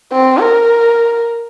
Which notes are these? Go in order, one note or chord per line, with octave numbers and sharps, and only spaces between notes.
C4
A#4